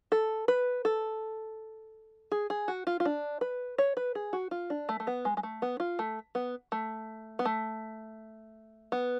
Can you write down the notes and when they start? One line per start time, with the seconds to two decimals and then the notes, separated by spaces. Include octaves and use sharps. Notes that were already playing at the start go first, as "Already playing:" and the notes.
0.12 A4
0.48 B4
0.85 A4
2.32 G#4
2.50 G#4
2.68 F#4
2.87 F4
3.00 F4
3.05 D4
3.41 B4
3.78 C#5
3.97 B4
4.15 G#4
4.33 F#4
4.51 F4
4.70 D4
4.89 A3
5.00 A3
5.07 B3
5.25 G#3
5.37 G#3
5.43 A3
5.62 B3
5.80 F4
5.99 A3
6.35 B3
6.72 A3
7.39 B3
7.45 A3
8.92 B3